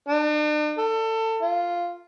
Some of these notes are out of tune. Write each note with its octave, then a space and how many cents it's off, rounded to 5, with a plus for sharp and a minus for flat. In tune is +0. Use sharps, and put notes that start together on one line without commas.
D4 +45
A4 +25
F4 -5